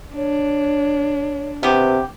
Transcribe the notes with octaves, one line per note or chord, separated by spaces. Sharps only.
D4 C#5
C3 B3 G4 B4